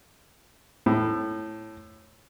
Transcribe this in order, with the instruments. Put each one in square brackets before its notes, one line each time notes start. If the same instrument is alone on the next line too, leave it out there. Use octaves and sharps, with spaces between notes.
[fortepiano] A2